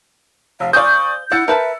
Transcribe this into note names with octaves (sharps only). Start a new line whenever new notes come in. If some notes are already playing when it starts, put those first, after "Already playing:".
F1 F5
C5 D5 F5 G#5 C#6 D#6 G6
E4 F#5 E6 A6 C#7
A#4 B4 E5 A5